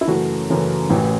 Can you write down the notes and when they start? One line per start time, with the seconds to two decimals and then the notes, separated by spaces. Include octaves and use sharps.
0.01 E4
0.07 F#2 C#3 E3 A3 F#4
0.49 F#2 C#3 E3 A3
0.90 A1 A2 E3